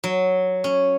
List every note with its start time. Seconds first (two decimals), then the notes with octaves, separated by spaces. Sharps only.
0.04 F#3
0.64 C#4